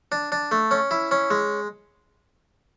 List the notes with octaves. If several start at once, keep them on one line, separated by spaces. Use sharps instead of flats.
D4
D4
A3
C#4
E4
C#4
G#3